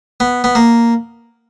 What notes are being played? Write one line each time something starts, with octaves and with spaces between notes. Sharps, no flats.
B3
B3
A#3